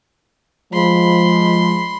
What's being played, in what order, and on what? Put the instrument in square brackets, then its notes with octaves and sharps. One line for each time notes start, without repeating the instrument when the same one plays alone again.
[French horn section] F3 G#3 [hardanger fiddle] B5 C6